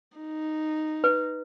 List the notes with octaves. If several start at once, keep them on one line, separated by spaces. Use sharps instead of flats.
D#4
B4